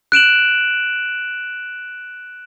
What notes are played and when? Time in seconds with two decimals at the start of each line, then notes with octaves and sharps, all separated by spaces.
0.12 F#6 D7 E7 F#7